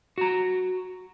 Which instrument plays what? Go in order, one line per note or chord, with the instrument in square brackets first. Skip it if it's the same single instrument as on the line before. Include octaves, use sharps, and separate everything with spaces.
[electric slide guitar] F#4 A#5